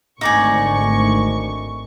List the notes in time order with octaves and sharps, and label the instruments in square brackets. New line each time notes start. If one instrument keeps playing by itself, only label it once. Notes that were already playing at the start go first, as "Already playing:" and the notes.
[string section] G#1 D2 C#6 [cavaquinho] D#4 D5 G#5